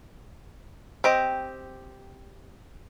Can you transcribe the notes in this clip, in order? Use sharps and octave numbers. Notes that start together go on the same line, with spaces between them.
C4 G4 D#5